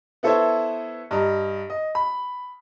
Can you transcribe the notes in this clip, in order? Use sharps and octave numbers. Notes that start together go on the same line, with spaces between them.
B3 E4 A4 C5 C#5 E5
G2 D#5 A#5
D#5
B5